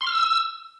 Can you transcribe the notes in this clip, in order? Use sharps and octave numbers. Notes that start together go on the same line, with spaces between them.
C6
F6
E6